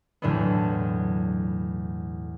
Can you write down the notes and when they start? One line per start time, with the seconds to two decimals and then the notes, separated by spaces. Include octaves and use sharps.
0.22 B1 E2 A2 D3 F#3 B3